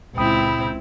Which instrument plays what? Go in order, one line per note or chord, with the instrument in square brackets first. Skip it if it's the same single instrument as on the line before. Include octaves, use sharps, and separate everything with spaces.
[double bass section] C#2 [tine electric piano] A#2 G5 D#6 [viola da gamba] C4 E4 [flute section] B5 G6